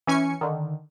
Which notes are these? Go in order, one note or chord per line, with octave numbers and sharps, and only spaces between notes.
E3 C#4 G#5 C#7
D3 D#3